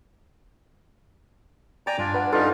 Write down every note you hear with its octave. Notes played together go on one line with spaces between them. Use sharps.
D5 G5 G#5 A#5
G2 D4 F4 G#5
B4 F#5
G2 C#4 D#4 F4 A4 D5 F#5